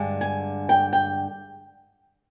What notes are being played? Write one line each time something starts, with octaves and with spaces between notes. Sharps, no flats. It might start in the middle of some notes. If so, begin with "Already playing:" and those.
Already playing: G2 D3 G#3
G#5
G5
G5